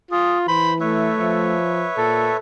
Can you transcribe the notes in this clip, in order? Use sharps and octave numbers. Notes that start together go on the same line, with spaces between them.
F4 G#4
E3 C5 B5 C6
A3 B4 C#5 E5
F3
A#2 A4